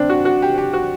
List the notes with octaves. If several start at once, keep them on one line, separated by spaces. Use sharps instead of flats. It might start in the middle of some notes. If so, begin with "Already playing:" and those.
Already playing: C4 D4
F#4
F#4
G4
G4
F#4